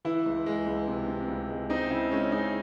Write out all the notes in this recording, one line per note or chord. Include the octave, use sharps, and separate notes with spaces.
E3 E4
C#2
G#3
C#2
C3
C3
C#2
G#3
C4 D#4
C#3 E4
G#3 C#4
G#3 D#4